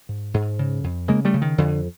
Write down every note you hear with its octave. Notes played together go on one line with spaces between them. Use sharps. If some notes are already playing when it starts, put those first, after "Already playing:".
G#2
G#2
C#3
F2
C#3 G#3 A#3
G3 A3
C#3
D#3
F2 D3